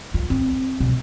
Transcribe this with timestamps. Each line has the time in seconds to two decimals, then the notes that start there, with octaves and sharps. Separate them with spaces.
0.14 F4
0.30 C4
0.80 B2